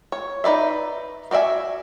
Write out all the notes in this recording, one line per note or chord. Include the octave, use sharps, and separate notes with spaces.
C#5
D#4 B4 D5 E5
B3 F#4 D5 E5 G#5